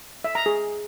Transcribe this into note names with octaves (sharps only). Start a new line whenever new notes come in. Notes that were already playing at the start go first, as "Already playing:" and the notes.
E5
A#5
G#4